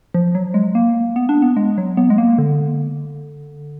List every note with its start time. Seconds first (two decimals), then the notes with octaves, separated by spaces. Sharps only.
0.14 F3
0.35 F#3
0.54 G#3
0.75 A#3
1.16 B3
1.29 D4
1.42 B3
1.57 G#3
1.78 F#3
1.97 B3
2.10 G#3
2.18 A#3
2.38 D3